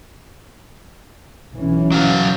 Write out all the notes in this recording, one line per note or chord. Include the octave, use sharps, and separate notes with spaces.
B1 E3 C#4
F#3 F5